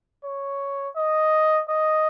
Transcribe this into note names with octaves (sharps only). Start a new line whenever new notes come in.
C#5
D#5
D#5